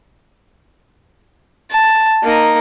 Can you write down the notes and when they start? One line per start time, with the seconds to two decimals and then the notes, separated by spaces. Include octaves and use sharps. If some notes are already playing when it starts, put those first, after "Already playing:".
1.71 A5
2.23 A#3 D#4